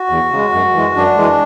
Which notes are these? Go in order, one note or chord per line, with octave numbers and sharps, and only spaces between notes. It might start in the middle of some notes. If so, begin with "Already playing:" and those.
Already playing: F#4
E2
C#3 G#3
F#2
E3 G#3
F#2 D4
E3 G#3